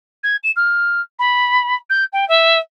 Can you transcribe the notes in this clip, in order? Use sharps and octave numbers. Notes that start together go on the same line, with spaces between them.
G#6
E7
F6
B5
G6
G5
E5